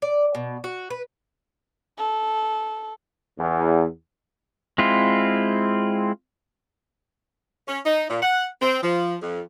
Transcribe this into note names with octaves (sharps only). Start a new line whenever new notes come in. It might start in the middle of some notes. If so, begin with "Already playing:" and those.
D5
B2
F#4
B4
A4
E2
G#3 C4 E4 F4
C#4
D#4
A#2
F#5
C4
F3
F2